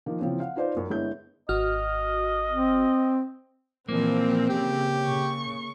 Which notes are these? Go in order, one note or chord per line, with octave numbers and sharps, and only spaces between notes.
D#3 F3 A#3
C#3 E3 F3 C4 C#4
F5 F#5
D#4 F4 B4 C5 D5 F5
F#2
G1 G#3 B3 E4 C#5 G6
G#1 F#4 D#5 F6
C4
A#2 E3 F3 A#3 C4
C#3 G4
C#3 C#6